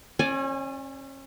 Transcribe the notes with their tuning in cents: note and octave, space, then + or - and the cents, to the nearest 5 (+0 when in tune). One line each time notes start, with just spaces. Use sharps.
C#4 -35 D5 +0 G#5 +0